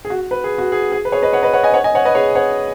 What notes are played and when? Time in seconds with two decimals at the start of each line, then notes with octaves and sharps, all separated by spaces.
0.05 G#4
0.10 F#4
0.31 B4
0.44 G#4
0.58 F#4
0.72 G#4
0.92 G#4
1.05 B4
1.12 G#4 C#5
1.22 B4 D#5
1.33 C#5 F#5
1.43 B4 D#5
1.53 C#5 F#5
1.63 D#5 G#5
1.74 C#5 F#5
1.84 D#5 G#5
1.95 C#5 F#5
2.05 B4 D#5
2.15 G#4 C#5
2.35 C#5 F#5